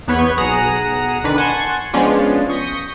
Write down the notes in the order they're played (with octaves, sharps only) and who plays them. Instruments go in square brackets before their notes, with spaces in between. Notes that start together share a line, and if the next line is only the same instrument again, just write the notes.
[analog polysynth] E2 B3 B4 C#5 G6 G#6
B1 G#4 F#5 A#5 D#6 E7
D3 D#3 D4 B4
F#5 G#5 A5 C6 C#6 G#6
F3 G#3 B3 C#4 D4 F4
C#6 D#6 G6 A#6 B6